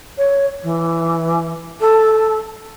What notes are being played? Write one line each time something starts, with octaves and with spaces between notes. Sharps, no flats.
C#5
E3
A4